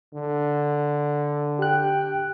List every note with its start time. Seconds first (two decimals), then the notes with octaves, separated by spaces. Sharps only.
0.13 D3
1.59 G4 G5 F#6